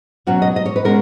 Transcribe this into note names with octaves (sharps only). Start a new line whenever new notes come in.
B2 F#3 C#4 F#4
D#5
D#5
C#5
B4
B2 G#3 C#4 A#4